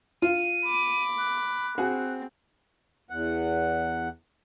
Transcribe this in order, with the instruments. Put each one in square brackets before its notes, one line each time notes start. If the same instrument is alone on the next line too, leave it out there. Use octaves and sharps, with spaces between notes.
[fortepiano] F4 [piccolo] D#7
[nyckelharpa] B5 D6
[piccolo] F#6
[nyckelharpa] C4 [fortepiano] F#4 G#4
[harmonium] E2 F#5